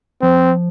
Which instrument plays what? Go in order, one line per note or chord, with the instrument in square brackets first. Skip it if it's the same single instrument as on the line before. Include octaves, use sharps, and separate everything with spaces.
[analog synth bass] F3 [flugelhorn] C4